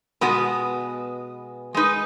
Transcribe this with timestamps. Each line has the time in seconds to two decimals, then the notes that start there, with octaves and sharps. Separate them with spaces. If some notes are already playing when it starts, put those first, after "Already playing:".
0.21 B2 G#3 B3 F#4 B4
1.74 G#3 D#4 B4